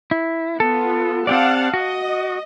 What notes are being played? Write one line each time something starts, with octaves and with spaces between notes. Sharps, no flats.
E4
B3 F4 A4
C4 G4 D5 F5 F#5 A5
F#4 D#5